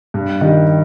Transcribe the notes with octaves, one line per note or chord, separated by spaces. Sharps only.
G2
D#3 G3